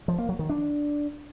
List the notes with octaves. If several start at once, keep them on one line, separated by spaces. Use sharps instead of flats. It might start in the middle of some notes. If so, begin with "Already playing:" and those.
F3
A#3
F#3
D#3
D4